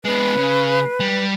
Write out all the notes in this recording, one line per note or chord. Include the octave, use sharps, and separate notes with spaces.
G#3 B3 B4
C#3
G3